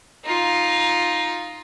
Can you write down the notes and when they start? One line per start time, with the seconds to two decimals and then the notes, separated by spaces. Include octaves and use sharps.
0.24 D#4 F4